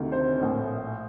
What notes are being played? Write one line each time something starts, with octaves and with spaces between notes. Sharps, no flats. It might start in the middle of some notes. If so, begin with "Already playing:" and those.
Already playing: D2 C3 D#3
C5
A#1 A2